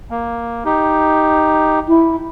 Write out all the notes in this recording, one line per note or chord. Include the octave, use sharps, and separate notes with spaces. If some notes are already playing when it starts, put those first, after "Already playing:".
A#3
D#4 G4
E4